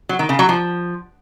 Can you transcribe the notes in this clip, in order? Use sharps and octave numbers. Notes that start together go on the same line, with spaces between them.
F#3
D#3
C#3
F#3
F3